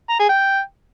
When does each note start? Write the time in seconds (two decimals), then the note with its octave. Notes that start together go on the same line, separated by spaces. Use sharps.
0.10 A#5
0.19 G#4
0.29 G5